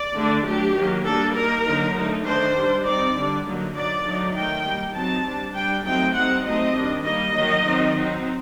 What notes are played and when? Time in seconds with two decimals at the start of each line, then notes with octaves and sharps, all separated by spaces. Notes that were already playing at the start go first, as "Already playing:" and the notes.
Already playing: D5
0.14 D3 A3 D4
0.45 F#3 A3 D4 G4
0.75 D#3 F#3 A#3
1.05 G3 A#3 D4 A4
1.35 G3 A#3 D#4 A#4
1.65 D3 F#3 A#3 D#4
1.95 D3 A3 D#4
2.25 D#3 A3 D4 C5
2.55 G3 D4
2.84 G3 C4 D#4 D5
3.15 D3 G3 D4
3.44 D3 F#3 A#3 D#4
3.74 F#3 A#3 D#4 D5
4.05 D3 F#3 A3 D#4
4.34 D#3 A3 D#4 G5
4.65 G3 A#3 D#4
4.95 F#3 C4 D#4 A5
5.25 G3 D4
5.55 G3 D4 G5
5.84 F#3 A3 C4 D#4 G5
6.14 G3 C4 D#4 F#5
6.45 F#3 A3 C4 D#4 D#5
6.75 D#3 G3 D4
7.04 G3 A#3 D#4 D#5
7.34 D#3 F#3 A#3 D#4
7.65 D#3 F#3 C4 D#4
7.95 F#3 C4 D#4